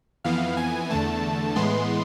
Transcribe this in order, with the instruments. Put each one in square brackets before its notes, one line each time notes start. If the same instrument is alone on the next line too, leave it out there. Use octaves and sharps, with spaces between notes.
[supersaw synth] F2 E3 B3 F5
G#5
E2 D3 A3 A5
A2 E3 G#3 B3 C6